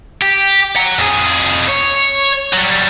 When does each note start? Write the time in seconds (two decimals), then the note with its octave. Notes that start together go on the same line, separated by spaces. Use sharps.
0.22 G4
0.76 F#5 A#5
0.98 F2 G#4
1.69 C#5
2.53 F#3 G3